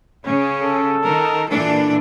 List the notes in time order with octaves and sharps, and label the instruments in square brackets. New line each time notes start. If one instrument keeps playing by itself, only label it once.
[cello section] C#3 [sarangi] C#4
[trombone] A4
[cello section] D#3 [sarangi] A#4
[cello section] A#2 E3 D4 [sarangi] A4